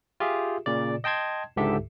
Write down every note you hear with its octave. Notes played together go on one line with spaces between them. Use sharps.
F4 G4 G#4 E5
A#2 C#3 D5
D#5 G5 A5 C6 G#6
C#2 G#2 D3 G4 A4 E5